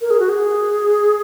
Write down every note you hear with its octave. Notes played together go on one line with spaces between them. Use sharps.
A#4
G#4
F#4
G#4